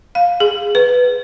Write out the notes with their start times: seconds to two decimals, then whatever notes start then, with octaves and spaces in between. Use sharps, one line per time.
0.15 F5
0.40 G#4
0.75 B4